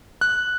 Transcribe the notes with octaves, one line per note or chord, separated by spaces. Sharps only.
F#6